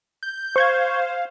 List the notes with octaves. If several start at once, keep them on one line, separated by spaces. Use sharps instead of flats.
G6
C5 F5 C#6 G6 G#6